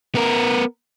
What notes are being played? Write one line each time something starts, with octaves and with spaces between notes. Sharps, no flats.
B3 A#4